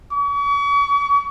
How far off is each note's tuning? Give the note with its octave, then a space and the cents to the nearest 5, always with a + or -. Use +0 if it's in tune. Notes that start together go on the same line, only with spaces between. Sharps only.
C#6 +40